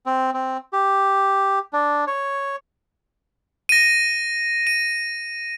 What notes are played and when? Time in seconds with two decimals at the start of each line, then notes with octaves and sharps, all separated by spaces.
0.06 C4
0.34 C4
0.73 G4
1.73 D4
2.07 C#5
3.69 A#6 D#7
4.67 D#7